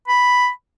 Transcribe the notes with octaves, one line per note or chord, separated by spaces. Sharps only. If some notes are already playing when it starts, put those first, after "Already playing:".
B5